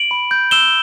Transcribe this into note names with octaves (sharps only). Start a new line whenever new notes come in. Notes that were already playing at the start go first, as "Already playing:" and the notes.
Already playing: D7 F#7
B5
G6
E6 E7 G7